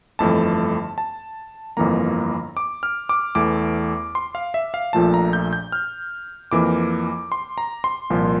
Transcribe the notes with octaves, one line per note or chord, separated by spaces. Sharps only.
G1 F2 E3 A3 A5
A5
G1 F2 E3 A#3 A#5
D6
F6
D6
E2 E3 A3 D6
C6
F5
E5
F5
A#1 A#2 F3 A3 A5
A#5
G6
G6
F6
F2 E3 A#3 D6
C6
A#5
C6
C2 A#2 F3 A#3